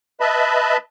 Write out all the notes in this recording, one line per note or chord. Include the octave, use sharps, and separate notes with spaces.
B4 D#5 E5 A5 B5